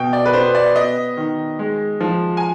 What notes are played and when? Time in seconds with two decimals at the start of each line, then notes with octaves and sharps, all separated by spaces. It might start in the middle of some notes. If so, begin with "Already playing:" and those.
Already playing: B2 G5
0.13 D5
0.26 B4
0.34 B3 C5
0.55 D5
0.75 B3 D#5
1.17 D#3
1.59 G#3
2.01 F3
2.37 G#5